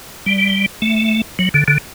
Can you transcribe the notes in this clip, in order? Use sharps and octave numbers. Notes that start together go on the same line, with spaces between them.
G3
A3
F#3
D3
D3